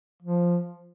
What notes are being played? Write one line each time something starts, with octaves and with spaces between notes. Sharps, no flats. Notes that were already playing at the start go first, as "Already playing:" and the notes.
F3